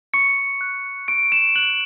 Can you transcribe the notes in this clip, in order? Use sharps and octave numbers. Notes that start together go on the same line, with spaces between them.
C#6 C#7
F#6
C#6 D7
E7
F#6 F#7